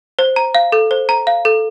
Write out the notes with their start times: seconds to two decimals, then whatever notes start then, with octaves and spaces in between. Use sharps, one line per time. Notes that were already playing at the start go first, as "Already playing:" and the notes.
0.19 C5
0.36 A#5
0.55 F5
0.72 A4
0.91 C5
1.09 A#5
1.27 F5
1.45 A4